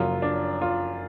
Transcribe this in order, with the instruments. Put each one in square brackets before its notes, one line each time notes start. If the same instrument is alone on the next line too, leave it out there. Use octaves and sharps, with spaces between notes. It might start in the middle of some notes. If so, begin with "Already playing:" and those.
Already playing: [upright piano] F#1 F#2 F3 [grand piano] F4
[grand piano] D4
F4